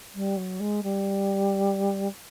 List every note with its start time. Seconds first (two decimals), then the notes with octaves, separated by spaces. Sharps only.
0.15 G3
0.37 F#3
0.60 G#3
0.83 G3